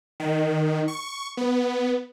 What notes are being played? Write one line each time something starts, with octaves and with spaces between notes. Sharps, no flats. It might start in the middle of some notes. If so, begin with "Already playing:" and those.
D#3
C#6
B3